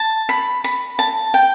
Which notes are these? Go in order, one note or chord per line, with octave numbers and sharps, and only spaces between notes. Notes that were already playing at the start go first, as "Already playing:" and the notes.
Already playing: A5
B5
B5
A5
G5